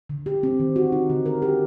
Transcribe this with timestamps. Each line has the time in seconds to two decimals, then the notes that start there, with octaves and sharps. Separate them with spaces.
0.10 D3
0.26 G4
0.43 C4
0.60 D#3
0.76 F#4
0.92 D#4
1.09 D3
1.26 A#4
1.42 G4